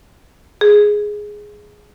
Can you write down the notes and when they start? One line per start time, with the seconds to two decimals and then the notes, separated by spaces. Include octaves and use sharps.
0.61 G#4